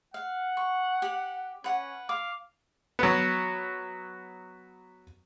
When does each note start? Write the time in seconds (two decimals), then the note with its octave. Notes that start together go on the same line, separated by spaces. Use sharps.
0.14 F5 F#5
0.57 C#6
1.02 G4
1.64 C#4 B4 F#5
2.09 F5 D6
2.99 F#3 B3